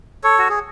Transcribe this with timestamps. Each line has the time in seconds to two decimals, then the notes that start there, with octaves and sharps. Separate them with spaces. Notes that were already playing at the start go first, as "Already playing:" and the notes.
0.24 A4 C#5
0.39 F#4
0.49 G#4